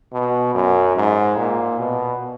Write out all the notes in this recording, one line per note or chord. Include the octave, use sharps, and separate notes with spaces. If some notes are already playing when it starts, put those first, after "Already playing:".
B2
F#2
G#2
A#2
B2